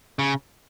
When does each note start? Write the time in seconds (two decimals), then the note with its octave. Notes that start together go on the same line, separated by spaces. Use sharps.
0.19 C#3